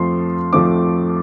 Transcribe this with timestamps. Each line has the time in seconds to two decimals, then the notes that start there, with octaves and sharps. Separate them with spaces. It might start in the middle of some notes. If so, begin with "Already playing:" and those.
Already playing: F2 F3 A3 C4 C6
0.53 F2 F3 A3 C4 D6